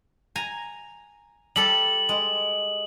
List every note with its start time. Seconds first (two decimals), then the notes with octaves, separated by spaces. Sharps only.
0.36 G#5 A#5
1.56 G3 A4 A5 F#7
2.09 G#3